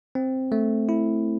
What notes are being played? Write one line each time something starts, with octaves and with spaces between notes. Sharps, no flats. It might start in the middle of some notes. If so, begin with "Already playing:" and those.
C4
A3
E4